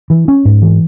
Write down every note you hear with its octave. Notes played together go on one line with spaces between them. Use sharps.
E3
C#4
G#2
E3